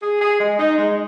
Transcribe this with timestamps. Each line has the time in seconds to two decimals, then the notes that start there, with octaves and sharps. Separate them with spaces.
0.02 G#4
0.21 G#4
0.39 G#3
0.59 D#4
0.78 G#3